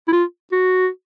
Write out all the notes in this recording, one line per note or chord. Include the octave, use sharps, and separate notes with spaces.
E4
F4
F#4